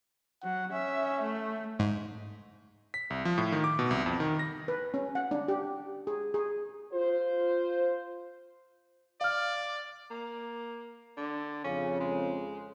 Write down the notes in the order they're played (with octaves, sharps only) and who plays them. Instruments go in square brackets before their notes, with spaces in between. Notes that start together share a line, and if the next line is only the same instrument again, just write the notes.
[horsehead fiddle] F#3 [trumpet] F#5
[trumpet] C#4 [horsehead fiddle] E5
[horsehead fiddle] A3
[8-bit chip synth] G#2
[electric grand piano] B6
C2
F3
A2
D#3
D6
B2
C2
F2
D#3
A#6
[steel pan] B4
C#4
F#5
D4
G4
G#4
G#4
[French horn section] F4 C5
[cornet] D5 [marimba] F5 F6
[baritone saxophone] A#3
D3
[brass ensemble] F2 C#3 [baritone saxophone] C#4
[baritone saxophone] G#3